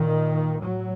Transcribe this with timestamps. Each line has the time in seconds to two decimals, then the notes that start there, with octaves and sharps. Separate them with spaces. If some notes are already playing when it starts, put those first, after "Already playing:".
Already playing: A#2 D#3
0.62 A2 F#3